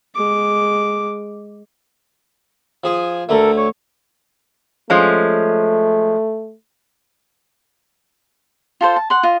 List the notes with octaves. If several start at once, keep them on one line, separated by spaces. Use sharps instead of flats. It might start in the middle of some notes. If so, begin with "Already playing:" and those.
G#3 D6
F3 G#4
D2 A3 A4 A#4
C#5 C#6
F3 G#3 A3 C#4
F4 A4 C5
A5
F#5 C6
F4 D#5